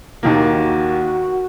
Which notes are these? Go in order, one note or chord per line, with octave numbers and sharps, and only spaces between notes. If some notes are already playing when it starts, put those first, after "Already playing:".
D#2 D#3 A#3 F#4